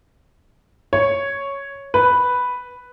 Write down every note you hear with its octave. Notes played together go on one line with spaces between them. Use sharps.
C#5
B4